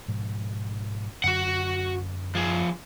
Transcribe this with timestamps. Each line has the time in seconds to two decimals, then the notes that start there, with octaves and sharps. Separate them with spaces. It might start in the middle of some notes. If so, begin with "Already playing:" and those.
0.08 G#2 B2 F3
1.24 F#2 D3 F#4 F#5
2.35 F3 G#4